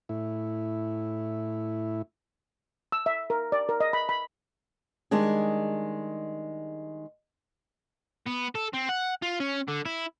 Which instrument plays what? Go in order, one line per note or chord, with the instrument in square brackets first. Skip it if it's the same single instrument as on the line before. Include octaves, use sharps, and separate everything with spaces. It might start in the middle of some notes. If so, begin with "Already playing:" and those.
[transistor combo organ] A2 E4
[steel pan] E6
E5
A#4
D5
A#4
D#5
B5
B5
[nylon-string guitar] D#3 G3 G#3 D4 G#4
[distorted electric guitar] B3
A4
C4
F#5
F4
C#4
D3
E4